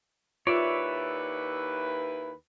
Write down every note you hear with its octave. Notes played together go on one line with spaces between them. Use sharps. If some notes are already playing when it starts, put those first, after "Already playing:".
D#2 E4 F4 B4 C#5 D5 E5